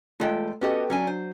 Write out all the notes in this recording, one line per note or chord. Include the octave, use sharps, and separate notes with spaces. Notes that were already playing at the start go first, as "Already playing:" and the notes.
E2 G#3 A3 F4 A4 G5
B3 C#4 F#4 G4 A4 D#5
F#3 C#4 D4 G#5
C5